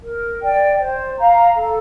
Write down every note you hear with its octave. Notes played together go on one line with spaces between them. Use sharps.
A#4
D5 G5
C5
F5 A#5
A4